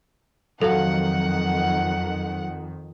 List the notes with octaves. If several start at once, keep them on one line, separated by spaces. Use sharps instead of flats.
F2 D#3 F#3 F#4 A4 F5 F#5